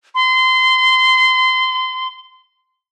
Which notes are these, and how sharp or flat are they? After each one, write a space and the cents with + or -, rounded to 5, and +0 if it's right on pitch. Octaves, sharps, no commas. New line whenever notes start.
C6 -25